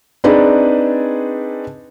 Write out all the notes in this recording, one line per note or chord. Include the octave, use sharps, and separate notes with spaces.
C4 D4 D#4 G#4 B4 D5